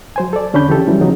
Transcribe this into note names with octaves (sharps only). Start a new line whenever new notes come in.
F#3 C5 G#5
A4 D5
E2 D3 C#4 D4 B5 G6
C#3 E3 G4 A4
E3 F#3 G3 C#4
C#3 F3 F#3 B3 D#4